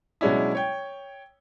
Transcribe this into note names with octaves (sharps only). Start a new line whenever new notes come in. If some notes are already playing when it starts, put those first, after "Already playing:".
B2 F#3 G#3 C#4 D4 E4
C#5 G5